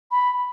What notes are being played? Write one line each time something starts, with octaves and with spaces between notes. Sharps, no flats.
B5